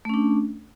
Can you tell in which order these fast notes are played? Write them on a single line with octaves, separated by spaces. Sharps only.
A3 C#4 D4